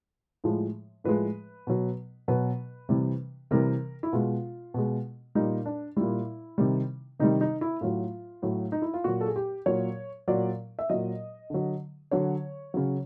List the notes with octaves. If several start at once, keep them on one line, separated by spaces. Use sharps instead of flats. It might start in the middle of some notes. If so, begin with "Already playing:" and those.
A2 F3 G#3
A2 F3 G#3 B4
B2 F#3
B2 F#3 B4
C3 E3 G3
C3 E3 G3 A#4
E4
B2 G#3 F4
B2 G#3
A#2 G3 D#4
D4
A#2 G3 E4
C3 D#3 G3
C3 D#3 G3 D#4
D#4
E4
A2 F#3 F4
A2 F#3
D#4
E4
F4
A#2 F#3 F#4
A4
G#4
G4
A#2 F#3 C#5
A#2 F#3 D5
E5
A#2 F#3 D#5
D3 F#3
D3 F#3 C#5
C#3 F#3